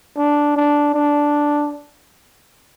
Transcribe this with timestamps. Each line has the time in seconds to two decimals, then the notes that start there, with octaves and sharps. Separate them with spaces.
0.17 D4
0.56 D4
0.94 D4